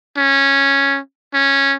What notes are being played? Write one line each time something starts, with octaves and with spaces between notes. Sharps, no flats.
C#4
C#4